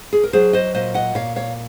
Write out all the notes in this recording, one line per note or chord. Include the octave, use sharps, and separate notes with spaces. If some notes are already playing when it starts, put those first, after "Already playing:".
G#4
A#4
F#3 G#4 C5
C5 D#5
A#2 C5 D#5
D#5 F#5
A#2 C#5 F5
C#5 F5